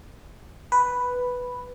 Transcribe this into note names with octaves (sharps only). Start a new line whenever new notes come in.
B4